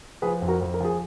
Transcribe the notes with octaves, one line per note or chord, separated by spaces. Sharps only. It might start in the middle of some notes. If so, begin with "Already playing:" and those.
F3 G#4 B4
F2
F#4 A#4
F2
A#4
F3 G#4